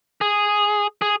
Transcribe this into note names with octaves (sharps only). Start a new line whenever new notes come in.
G#4
G#4